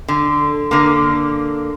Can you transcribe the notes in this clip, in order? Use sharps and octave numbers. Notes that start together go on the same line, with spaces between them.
D3
D3 A#3